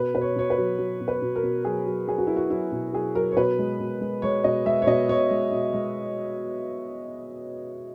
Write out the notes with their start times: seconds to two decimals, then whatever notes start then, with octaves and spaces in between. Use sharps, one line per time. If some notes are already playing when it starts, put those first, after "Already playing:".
Already playing: B2 B4
0.15 B2 B4
0.21 C#5
0.36 B2 C#5
0.50 B4
0.58 F#3
0.78 F#3
1.00 B2
1.08 B4
1.22 B2
1.36 A#4
1.43 B2
1.65 F#3 G#4
1.86 F#3
2.07 F#3 G#4
2.18 F#4
2.27 F#3 E4
2.36 F#4
2.50 F#3 E4
2.72 B2
2.93 F#3 G#4
3.15 F#3 A#4
3.32 C#5
3.36 B2 B4
3.59 G#3
3.80 B2
4.01 G#3
4.22 G#3 C#5
4.44 B2 D#5
4.65 G#3 E5
4.82 C#5
4.87 B2 D#5
5.09 B2 C#5
5.30 G#3
5.52 B2
5.74 G#3